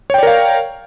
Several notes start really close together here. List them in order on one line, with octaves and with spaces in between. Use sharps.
C#5 G5 D5 A#4 F5